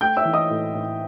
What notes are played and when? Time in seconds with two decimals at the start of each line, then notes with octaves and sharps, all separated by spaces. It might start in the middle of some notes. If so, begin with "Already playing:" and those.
0.01 A3 G5 G6
0.17 E5 E6
0.25 E3
0.33 D#5 D#6
0.50 A2
0.74 A2